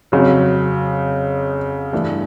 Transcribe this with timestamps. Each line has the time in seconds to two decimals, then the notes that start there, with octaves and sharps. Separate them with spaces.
0.12 F2 C#3 F#3
1.92 G2 E3 A3 D4